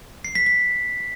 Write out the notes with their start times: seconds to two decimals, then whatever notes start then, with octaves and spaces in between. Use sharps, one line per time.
0.24 C7
0.35 B6
0.46 B6